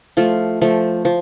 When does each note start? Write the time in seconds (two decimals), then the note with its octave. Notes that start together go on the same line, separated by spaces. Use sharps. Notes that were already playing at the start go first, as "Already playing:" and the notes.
0.17 F3 A3 F4
0.61 F3 A3
1.05 F3